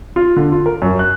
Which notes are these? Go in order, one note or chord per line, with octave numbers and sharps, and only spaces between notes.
F4
D3
F4
A#4
F#2
F#6